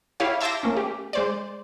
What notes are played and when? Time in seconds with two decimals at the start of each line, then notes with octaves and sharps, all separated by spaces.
0.20 E4 G4 C#5 F5
0.40 E5 A5 C6 D6 G6 A#6
0.63 A3 A#3 C#4
0.75 G4 G#4
1.13 G#3 C5 D5